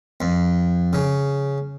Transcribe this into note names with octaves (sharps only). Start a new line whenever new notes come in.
F2
C#3